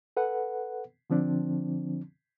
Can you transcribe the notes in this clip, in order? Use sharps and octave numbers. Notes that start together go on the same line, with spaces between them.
A4 B4 F#5
D3 F3 C4 D4